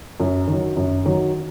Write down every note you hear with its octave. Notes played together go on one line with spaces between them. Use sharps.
F#2
D#3 F#3
F#2
D#3 F#3